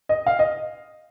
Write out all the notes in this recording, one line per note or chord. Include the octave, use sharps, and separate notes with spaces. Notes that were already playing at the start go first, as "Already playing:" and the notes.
D#5
F5
D#5